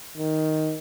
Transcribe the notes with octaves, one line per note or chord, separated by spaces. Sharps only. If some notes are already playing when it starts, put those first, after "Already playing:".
D#3